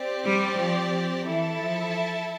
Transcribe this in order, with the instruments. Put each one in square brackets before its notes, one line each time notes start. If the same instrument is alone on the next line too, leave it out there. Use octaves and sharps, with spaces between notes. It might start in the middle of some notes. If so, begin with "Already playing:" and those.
Already playing: [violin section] C4 G4 D5
[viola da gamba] G3
F3
F3
[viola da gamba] E3 [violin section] E4 A4 E5 A5
[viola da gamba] F3